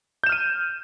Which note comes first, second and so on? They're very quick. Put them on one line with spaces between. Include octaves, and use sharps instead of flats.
G6 E7 F6 D#7